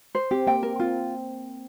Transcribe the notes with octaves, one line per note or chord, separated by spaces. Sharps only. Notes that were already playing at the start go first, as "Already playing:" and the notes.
C5
C4 G4
A#3 G5
A#4
C4 F4